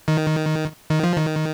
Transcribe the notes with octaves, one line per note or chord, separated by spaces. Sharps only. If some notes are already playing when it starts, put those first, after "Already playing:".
D#3
D#3
F3
D#3